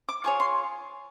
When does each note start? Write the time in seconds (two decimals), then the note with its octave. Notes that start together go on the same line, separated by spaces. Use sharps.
0.09 D6
0.24 F4 G#4 C#5 C#6
0.40 C6